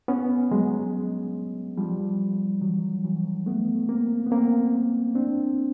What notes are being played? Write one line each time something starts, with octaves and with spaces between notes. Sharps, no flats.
B3 C#4
F#3 G#3
F3 G3
E3 F#3
E3 F#3
A3 B3
A#3 C4
B3
A#3 C4
C4 D4